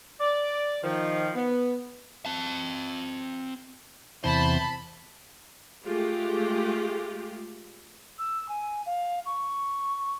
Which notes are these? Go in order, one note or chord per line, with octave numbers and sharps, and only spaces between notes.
D5
D#3 F3
B3
C4 A5
E2 C3 E4 C5 A5 B5
G#3 A3 F4 G4
E6
G#5
F5
C#6